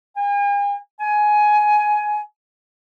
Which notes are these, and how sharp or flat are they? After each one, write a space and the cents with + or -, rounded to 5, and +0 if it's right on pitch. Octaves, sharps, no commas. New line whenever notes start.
G#5 -45
G#5 +15